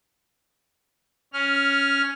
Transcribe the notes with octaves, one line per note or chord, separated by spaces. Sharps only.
C#4 F6